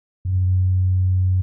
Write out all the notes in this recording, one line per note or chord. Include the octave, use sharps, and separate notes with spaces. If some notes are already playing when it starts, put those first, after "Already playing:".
F#2